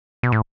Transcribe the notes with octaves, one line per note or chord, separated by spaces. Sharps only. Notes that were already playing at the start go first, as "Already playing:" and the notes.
B2
A2